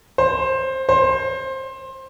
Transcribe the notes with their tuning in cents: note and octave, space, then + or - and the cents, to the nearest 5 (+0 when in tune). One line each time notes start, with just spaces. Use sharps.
C5 +15
C5 +20